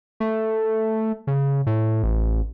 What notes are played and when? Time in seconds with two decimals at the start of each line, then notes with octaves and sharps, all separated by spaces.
0.20 A3
1.27 C#3
1.66 A2
2.03 A1